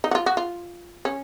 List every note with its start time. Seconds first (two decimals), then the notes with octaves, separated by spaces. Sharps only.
0.04 D#4
0.11 F#4
0.15 F4
0.26 F#4
0.37 F4
1.05 C#4